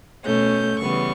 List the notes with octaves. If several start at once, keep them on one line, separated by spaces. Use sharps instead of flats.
B2 A3 C#4 G6
C#3 E3 G3 B3 C#6